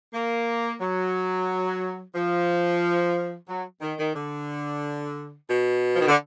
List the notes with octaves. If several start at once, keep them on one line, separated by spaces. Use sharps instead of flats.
A#3
F#3
F3
F#3
D#3
D#3
D3
B2
F3
D#3
D3